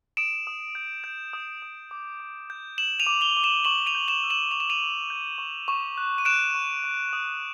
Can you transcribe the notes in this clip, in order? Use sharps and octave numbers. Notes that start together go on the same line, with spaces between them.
D#6 D7 E7
D#6
G6
G6
D#6
D#6
D6
D6
G6
G6 E7 F#7
D#7 F7
D6
F7 G7
D6
E7 F#7
C#6 E7 F#7
D#7 F7
G6
E7 F#7
E6
E7 F#7
C#6 F7
E7
D#7 F7
C#6
G6
C#6
C#6
F#6
D#7
F#6 D7 E7
C#6
C#6
D#6